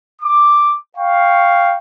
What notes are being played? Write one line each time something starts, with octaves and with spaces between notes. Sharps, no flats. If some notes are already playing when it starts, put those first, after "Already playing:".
D6
F5 G5 C#6